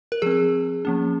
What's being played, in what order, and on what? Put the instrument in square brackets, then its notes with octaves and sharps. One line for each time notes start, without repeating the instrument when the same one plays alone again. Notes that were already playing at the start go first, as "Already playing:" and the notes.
[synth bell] A#4
F3 C4 G#4
F3 A#3 C#4